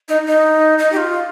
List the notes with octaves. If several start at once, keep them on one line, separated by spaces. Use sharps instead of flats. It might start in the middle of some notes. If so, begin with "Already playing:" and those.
D#4
D#4
D#4
G4
F4